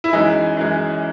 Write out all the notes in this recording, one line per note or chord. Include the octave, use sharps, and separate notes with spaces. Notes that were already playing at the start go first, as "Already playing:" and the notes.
E4
F#2 E3 G#3 D#4
F#2 E3 G#3